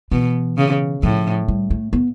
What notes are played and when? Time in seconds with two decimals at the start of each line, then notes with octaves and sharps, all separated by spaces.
0.11 B2 E3
0.57 C#3
1.03 A2 F3
1.48 G3
1.70 A3
1.93 B3